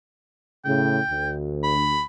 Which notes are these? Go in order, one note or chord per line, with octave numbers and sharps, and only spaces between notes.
A2 C#3 G5
D2
B5